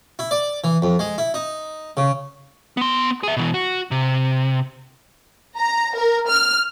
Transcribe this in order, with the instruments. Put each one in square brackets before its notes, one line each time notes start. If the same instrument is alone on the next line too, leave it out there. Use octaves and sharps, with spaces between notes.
[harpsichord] E4
D5
E3
F2
G#3
E4
D#4
C#3
[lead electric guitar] B3 C6
G#4 E5
B2 E3
F#4
C3
[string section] A#5
A#4
F6